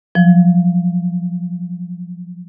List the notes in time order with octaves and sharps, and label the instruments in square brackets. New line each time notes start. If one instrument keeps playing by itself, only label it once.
[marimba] F3 F#3